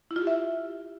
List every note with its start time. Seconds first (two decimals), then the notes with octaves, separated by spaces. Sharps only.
0.11 E4
0.16 F4
0.22 G4
0.27 E5